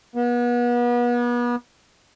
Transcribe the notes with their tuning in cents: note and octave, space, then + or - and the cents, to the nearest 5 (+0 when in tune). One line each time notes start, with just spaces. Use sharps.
B3 -35